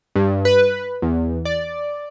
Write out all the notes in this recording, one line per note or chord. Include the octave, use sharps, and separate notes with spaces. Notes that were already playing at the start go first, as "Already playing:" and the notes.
G2
B4
E2
D5